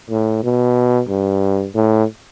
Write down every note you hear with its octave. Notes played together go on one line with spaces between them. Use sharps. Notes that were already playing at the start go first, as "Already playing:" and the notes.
A2
B2
G2
A2